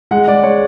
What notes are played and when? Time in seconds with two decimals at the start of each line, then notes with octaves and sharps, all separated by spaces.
0.11 G#3 F#5
0.28 G#3 D5
0.43 G#3 C#5